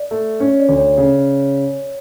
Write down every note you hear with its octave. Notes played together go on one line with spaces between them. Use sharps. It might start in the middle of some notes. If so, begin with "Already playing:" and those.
Already playing: D5
A3
C#4 C#5
D5
D2
C#5
C#3